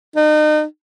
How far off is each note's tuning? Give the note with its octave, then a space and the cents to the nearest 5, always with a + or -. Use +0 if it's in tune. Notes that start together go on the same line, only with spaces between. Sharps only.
D#4 -35